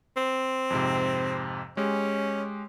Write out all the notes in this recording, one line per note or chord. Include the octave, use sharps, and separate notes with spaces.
C4
F2 G#2 C3
G#3 C#4 G4